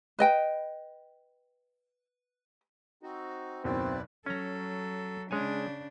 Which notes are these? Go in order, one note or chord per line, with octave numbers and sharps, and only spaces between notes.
B4 D#5 G5
C4 D#4 F#4
F#1 D#2 B2 C4 E4 B4 D5
F#3 C#4 A4 A#5
C#3 G#3 D4 C#5 G#5